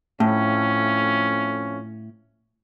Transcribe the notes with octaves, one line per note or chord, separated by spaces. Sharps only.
F2 A2 A3 C#4